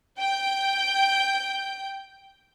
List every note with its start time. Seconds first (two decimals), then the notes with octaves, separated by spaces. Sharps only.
0.19 G5 G6